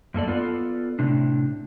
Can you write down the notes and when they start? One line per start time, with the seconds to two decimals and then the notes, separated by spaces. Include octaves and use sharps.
0.14 F#2 A#3 A4 D5
0.27 B3 F4 A4 D5
0.99 A2 C3 D4